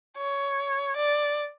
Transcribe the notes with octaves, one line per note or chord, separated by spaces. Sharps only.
C#5
D5